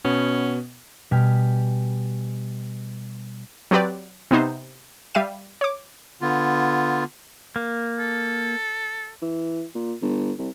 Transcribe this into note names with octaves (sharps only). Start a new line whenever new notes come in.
B2 B3 C#4
B2 G3 G4 G#5 F6 B6
F#3 C4 G4 B4 D5
C3 B3 D#4 C5
G3 E5 F5 D#7
C#5 D6
D3 B3 F4
A#3
A4
E3
A#2
G1
C2